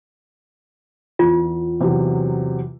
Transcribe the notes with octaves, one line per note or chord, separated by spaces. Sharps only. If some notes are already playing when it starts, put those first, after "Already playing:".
E2 F4
E2 C3 F#3